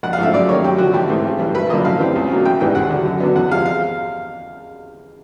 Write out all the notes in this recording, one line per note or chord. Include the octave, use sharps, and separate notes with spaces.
A#1 F#5
F5
G#2 F3 A3 E5
F#2 D5
D#3 G3 A#3 C#5
F#2 G4
D3 F3 F#4
A1 G4
G#2 E3 A3 C4
G#1
G2 E3
G#1 B4
F#2 D3 F3 A#3 D#5
A2 F5
E3 G3 C4
C#2
B2 F#3 A#3
A1 G5
G#2 E3 G3 B3 G5
D#2 F#5
D3 F#3
F#2
D3 F#3 B3
E2 F#5
C3 F3 G#3 F5
F5